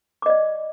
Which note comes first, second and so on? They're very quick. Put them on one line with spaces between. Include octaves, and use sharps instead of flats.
D6 D#5 D5